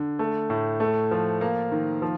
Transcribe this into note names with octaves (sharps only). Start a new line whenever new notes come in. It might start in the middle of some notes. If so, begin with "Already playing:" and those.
Already playing: D3
A3
A2
A3
F3
A#3
D#3
F3